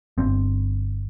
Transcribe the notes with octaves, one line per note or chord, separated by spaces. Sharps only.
G1 G2 C4